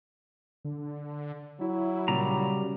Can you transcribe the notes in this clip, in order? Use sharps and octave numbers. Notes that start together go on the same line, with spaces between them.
D3
F#3 E4
A#2 C#3 G3 A#5